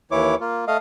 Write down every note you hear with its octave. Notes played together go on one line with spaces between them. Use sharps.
D#2 E3 E4 C#5 D6
A#3 F4
A3 D#5 F5